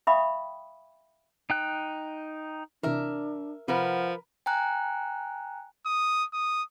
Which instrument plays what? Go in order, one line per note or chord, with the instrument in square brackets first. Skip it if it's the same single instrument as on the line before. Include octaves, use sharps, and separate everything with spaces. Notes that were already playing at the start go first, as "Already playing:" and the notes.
[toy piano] E5 F5 G5 B5 C#6 D#6
[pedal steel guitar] D#4 G5 F#6
[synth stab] C3 E3 [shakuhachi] D4 [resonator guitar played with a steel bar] A#4 E5
[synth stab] C3 [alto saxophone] F3 [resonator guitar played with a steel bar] A#4 B4 [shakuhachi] F#5
[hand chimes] G5 G#5 A#5 F#6
[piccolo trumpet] D#6
D#6